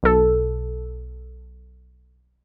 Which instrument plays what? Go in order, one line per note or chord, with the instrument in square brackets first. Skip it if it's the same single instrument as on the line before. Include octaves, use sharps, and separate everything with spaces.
[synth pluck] B1 A4